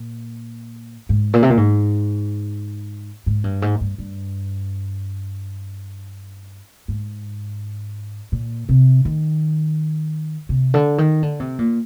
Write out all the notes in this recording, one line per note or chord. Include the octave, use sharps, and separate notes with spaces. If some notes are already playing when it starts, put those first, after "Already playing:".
Already playing: A#2
G#2
A#2
C3
A#2
G#2
G#2
G2
G#2
G2
G2
G#2
A#2
C3
D#3
C3
D3
D#3
D3
C3
A#2